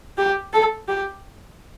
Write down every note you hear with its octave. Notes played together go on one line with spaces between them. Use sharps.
G4
A4
G4